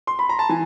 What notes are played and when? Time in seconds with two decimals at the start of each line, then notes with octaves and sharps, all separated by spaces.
0.07 C6
0.19 B5
0.29 A#5
0.39 A5
0.49 E3 G#5